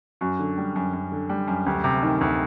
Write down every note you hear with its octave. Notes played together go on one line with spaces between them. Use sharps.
F#2 F#4
D3
G3
F#2
F#2
D3
G3
F#2
D2 G4
C3
D#3
D2